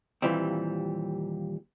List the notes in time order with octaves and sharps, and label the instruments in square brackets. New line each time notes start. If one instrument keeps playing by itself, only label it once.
[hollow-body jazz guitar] D#2 A#2 E3 G3 C4